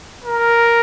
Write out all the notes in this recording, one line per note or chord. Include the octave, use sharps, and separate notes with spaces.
A#4